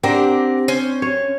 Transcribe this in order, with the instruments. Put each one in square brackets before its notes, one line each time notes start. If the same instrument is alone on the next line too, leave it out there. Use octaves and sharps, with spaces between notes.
[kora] C4 D4 [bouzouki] G4 A#4 F#5
[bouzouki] C#4 C5
[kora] C#5